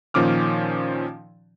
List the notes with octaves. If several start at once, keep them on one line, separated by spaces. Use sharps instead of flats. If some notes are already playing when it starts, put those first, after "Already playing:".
A#2 D#3 F3 C#4 D6 F6